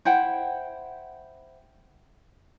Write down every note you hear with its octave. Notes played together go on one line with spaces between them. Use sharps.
E4 C5 F#5 G5